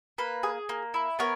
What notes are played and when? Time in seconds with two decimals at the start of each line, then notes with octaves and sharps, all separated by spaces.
0.18 A#3 B4
0.43 G#4
0.69 A#3
0.94 E4
1.19 B3 A#4 C#5